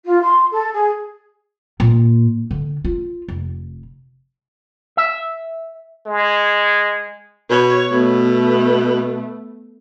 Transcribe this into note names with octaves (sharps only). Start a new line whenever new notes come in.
F4
C6
A4
G#4
A#2
D3
F4
F1
E5
G#3
B2 C#5
B2 A3 B3